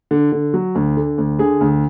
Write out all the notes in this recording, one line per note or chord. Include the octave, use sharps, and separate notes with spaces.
D3
D3
F#3
D2
D3
D2
D3 G#4
D2